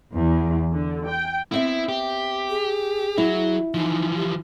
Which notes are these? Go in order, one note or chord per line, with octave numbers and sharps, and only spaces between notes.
E2
D3
G5
B3 C4 E4 E5
G4
G#4
F#3 E4
E3 F3 D#4
G4